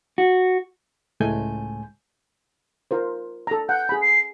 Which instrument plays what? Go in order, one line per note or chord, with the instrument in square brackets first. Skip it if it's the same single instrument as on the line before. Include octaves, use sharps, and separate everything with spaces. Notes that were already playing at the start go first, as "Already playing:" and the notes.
[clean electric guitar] F#4
[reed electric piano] C#2 A2 G#3 A3 G#5 G6
[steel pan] F4 A#4 C5
A4 A#5
[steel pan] F#5 [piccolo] G6
[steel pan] G#4 B5
[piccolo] C7